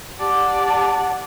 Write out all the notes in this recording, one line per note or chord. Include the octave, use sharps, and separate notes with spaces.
G4 D5 F#5 A5